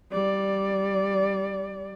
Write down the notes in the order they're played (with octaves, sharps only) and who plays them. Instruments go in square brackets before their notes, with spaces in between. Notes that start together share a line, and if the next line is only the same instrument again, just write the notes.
[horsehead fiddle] G3 D5